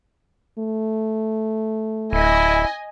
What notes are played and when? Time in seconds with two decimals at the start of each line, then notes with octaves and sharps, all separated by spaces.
0.59 A3
2.13 D1 E4 D#5 G#5